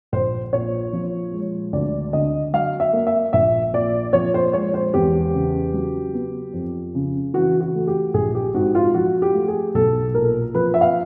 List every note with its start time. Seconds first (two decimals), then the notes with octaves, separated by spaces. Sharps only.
0.12 A#1 C5
0.53 A#2 C#5
0.93 F3
1.33 G#3
1.73 D2 D5
2.13 D3 D#5
2.53 F#3 F5
2.80 E5
2.93 A#3
3.07 E5
3.33 A#1 E5
3.73 A#2 D5
4.13 F3 C#5
4.34 C5
4.53 G#3 C#5
4.74 C5
4.94 E2 G4
5.34 C#3
5.73 F#3
6.14 B3
6.54 F2
6.95 C#3
7.34 E3 F#4
7.60 F#4
7.75 A3
7.87 G4
8.14 A#1 G#4
8.35 G4
8.54 G#2 F#4
8.75 F4
8.94 F3 F#4
9.22 G4
9.34 A3
9.48 G#4
9.74 B1 A4
10.14 A#2 A#4
10.54 F3 B4
10.74 E5
10.81 F5